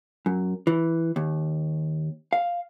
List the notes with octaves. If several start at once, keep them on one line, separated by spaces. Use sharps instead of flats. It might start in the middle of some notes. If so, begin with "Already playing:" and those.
F#2
E3
D#2
F5